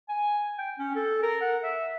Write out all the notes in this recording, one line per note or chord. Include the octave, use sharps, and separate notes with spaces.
G#5
G5
C#4
A4
A#4
F#5
E5